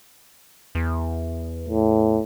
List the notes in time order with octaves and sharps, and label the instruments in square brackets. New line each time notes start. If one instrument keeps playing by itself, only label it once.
[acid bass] E2
[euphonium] A2